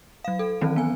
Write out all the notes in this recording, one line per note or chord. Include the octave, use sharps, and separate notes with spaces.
F#3 F5
A4
D#3 E3 F#3 C4 C#4
B3 G#5